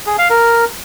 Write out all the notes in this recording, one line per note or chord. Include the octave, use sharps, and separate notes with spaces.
G#4
F5
A#4